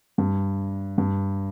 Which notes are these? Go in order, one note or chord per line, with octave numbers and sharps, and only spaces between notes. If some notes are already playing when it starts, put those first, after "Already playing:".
G2
G2